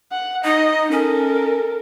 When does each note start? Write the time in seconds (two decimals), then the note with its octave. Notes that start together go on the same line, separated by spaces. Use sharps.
0.12 F#5
0.44 D#4 D#5
0.91 C#4 A4 A#4